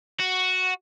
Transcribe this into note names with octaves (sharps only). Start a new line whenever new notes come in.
F#4